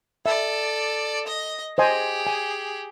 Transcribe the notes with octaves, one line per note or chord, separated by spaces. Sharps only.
A4 D5 E5
D#5
G4 G#4 C5 D#5 G#5
G#5